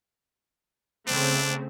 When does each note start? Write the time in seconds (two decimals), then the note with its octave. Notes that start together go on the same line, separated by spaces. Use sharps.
1.07 C#3 A3 C4 D4